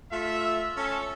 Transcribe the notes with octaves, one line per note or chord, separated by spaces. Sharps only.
A3 F4 E5
C#4 A4